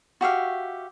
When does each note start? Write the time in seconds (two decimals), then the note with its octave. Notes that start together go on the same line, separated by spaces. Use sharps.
0.21 F#4 G4 E5 F5